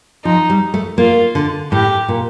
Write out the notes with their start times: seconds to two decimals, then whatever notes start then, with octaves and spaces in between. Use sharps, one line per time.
0.24 F3 D#4
0.50 G3
0.74 A3
0.98 A#3 F4
1.35 D3
1.72 A2 G4
2.08 A#2